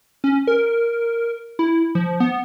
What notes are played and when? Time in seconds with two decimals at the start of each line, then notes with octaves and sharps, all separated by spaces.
0.24 C#4
0.47 A#4
1.59 E4
1.95 F3
2.20 B3